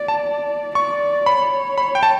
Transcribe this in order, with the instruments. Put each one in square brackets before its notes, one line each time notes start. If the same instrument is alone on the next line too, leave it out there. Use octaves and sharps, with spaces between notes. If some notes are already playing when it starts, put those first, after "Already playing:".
Already playing: [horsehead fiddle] D5
[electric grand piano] A5
[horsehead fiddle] D5 [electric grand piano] C#6
[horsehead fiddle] C#5 [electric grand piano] B5
[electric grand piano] B5
G5
A5